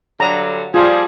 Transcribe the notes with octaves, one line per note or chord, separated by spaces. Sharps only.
G2 D3 F#3 A#5
F3 G3 F4 G#4